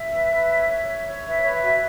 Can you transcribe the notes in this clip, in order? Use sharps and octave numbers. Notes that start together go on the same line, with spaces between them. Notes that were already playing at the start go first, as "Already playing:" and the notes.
Already playing: E5
B4
B4
C#5
C#5
C#5
C#5
B4 E5
B4 C#5
E5
F#4